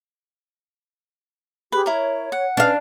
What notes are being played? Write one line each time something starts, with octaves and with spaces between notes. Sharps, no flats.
G4 G#4 B4
E4 A#4 C#5
F#5
C#4 D4 B4 D#5 F5